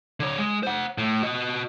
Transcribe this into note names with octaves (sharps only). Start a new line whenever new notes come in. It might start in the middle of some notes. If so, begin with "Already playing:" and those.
D3 C#5
G#3
C5 F#5
A2
F#4 D#5